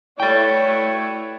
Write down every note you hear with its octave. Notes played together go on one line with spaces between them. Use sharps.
A3 E4 F#4 B4 C#5 D5 G5